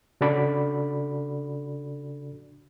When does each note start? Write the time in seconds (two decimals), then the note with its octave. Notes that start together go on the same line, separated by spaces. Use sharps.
0.21 C#3 D4 F#4 A4 D5 B5